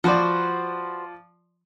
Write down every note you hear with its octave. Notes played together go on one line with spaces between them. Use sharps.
F3 F#4 B4 C5 D5